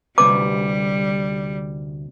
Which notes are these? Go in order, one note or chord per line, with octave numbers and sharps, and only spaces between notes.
D2 C3 G3 B4 D6